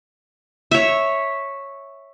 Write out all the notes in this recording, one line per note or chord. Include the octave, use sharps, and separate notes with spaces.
C#5 E5